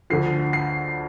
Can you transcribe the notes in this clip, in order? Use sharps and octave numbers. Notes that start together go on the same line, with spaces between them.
D2 D3 F3 C7
C7